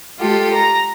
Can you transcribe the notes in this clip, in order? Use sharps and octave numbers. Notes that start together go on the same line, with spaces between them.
G#3 F4 G4 A4
A#5